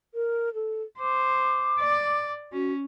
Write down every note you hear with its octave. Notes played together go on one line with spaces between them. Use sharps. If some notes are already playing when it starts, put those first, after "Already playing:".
A#4
A4
C5 D6
D5
C#4 F#4